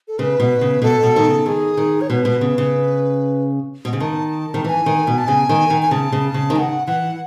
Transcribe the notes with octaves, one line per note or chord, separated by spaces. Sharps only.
A4
C#3 B4
B2
C#3
B2 A4
B2
D#3
C#3
D#3 G#4
D#3
C#5
B2 B4
B2
C#3
C#3
B2
C#3
D#3 A5
D#3
E3 G#5 A5
D#3
B2
A5
C#3 G#5
D#3
D#3
G#5
C#3 A5
C#3
C#3
D#3
C#3 F#5 G#5
E3 F#5